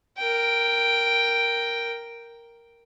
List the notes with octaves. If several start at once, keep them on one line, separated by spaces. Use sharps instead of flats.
A#4 G5